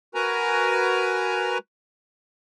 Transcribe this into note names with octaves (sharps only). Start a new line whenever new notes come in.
F#4 A#4 B4 G#5 A#5